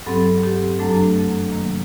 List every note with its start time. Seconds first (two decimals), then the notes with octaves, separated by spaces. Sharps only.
0.06 G2 F#3 C4 A4
0.43 G4
0.79 F#2 F#3 A3 D4 A4
1.51 C3 D#3 F#3 A#3